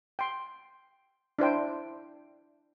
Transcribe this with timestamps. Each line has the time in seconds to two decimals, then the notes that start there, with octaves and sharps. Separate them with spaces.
0.19 G5 C6
1.39 D4 E4 C5 G5